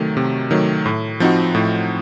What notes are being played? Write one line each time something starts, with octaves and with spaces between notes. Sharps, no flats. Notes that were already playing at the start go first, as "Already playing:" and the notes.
Already playing: C3 D#3 F#3 A3
C3
D#3 F#3 A3
A2
F3 C4 D#4 F#4
A2